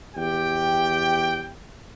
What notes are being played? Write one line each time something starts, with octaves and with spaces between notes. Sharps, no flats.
E2 G4 G5